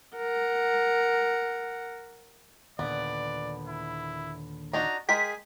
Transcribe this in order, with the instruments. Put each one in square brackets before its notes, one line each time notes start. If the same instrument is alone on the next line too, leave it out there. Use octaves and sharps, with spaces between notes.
[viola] A#4 F#5
[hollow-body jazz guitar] D#2 A#2 D3 [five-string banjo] B3 [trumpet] D5
[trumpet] E4
[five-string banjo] D4 D#4 F#4 [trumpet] A#5
[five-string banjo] G#3 A#4 G5 [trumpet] G#4 [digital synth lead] B6